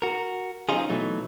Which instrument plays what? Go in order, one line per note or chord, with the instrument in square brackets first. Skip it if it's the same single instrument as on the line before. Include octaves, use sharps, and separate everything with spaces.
[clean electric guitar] F#4 A#4
F#3 C4 C#4 D#4 F4 G#4
B2 E3 F#3 A3 D#4